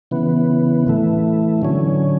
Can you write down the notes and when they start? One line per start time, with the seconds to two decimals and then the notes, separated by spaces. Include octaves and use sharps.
0.11 C#3 E3 B3
0.87 A2 E3 A3
1.62 D3 F#3 C#4